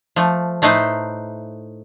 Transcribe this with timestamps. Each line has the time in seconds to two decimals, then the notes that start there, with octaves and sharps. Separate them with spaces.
0.16 F3 A3
0.62 A2 A3 D#4 B4 C5